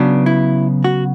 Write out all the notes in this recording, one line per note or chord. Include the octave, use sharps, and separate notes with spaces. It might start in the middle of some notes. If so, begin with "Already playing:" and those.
Already playing: C#3 F#3 B3 D4
E4
F#4